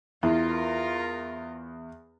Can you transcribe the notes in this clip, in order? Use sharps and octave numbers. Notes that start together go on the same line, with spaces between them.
E2 E4 F4 A#4